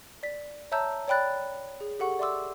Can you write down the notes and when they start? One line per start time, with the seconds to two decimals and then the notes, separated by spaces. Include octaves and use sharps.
0.23 D5 B6
0.72 C#5 E5 A5 A#5 E6 G6
1.08 C#5 D5 G5 B5 F#6 A6
1.81 G#4
1.99 G4 A4 F#5 C#6
2.19 D5 E5 C6 D6 E6